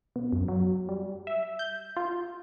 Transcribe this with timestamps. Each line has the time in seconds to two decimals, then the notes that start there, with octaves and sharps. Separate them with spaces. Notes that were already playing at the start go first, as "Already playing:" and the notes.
0.16 B2
0.32 F#2
0.48 F#3
0.89 G3
1.27 E5
1.59 G6
1.97 F4